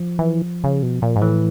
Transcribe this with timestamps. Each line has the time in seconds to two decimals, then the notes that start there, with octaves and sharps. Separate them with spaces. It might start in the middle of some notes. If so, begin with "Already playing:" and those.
Already playing: F3
0.19 E3
0.64 C#3
0.83 B2
1.02 A#2
1.16 G#2
1.22 A2 E3